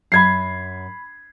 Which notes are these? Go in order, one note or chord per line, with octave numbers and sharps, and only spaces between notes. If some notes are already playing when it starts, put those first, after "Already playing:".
F#2 B5 G#6 C7